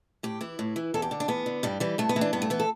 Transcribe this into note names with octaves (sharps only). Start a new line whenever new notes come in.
A2 G4
E3 E4
A2
E3
E2 A4
G4
D3
D4
E2 B3
D3
G2 G3
E3 G3
G2 A3
B3
E3
D4
G2 B3
A3
E3 B3
A4